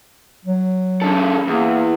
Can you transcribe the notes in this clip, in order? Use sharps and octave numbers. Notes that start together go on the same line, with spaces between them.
F#3
C#3 A4
E2 A#3